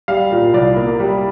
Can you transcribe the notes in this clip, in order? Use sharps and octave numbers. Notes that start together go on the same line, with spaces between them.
G3 F5
A#2
C2 D5
A#3
G3